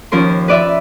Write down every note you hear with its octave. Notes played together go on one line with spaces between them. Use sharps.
D#2 F3 C#4 A#4 C6
B4 D5 E5